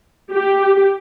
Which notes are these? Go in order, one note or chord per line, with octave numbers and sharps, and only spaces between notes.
G4